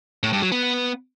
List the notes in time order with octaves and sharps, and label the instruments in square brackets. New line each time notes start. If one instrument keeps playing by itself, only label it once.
[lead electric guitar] A2
G2
F#3
B3